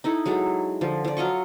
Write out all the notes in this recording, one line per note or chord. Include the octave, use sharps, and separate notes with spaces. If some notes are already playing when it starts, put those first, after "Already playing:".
D#4 E4 A4
F#3 G#3 A4
D3 F3
F3 D5
F#3 F4 D#5 C#6